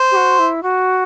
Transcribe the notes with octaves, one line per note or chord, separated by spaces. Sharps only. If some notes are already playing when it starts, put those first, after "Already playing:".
Already playing: C5
G4
F#4
E4
F#4